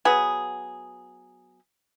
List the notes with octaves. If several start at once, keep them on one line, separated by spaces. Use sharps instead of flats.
F#3 B3 G#4